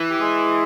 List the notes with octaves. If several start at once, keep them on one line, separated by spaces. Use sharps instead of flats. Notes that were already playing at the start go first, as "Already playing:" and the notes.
Already playing: E3
G4
G#3 G#4